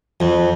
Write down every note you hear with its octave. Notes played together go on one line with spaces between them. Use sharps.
F2